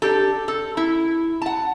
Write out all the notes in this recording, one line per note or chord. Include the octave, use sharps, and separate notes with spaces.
D4 G4 A4
A4
E4
F#5 A5